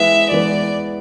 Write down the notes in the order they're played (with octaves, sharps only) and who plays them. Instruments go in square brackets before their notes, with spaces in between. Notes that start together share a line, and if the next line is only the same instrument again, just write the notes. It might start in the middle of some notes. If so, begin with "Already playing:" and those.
Already playing: [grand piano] E3 G#3 B3 [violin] E5
[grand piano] E3 G#3 B3 [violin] D5